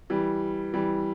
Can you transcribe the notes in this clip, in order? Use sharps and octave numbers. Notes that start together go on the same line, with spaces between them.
E3 G3
E3 G3